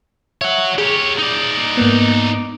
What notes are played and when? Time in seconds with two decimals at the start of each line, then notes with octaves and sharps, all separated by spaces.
0.41 C#5 E5 F#5
0.78 G4 G#4 C#5
1.19 D#4 D5
1.77 G#2 A#3 B3